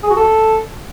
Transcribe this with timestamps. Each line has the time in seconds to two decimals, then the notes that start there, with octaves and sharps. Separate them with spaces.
0.03 G#4
0.10 F#4
0.16 A4